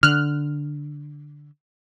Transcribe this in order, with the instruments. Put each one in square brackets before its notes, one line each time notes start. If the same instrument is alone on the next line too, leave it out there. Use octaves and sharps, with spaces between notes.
[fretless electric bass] D3 [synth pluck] F6 F#6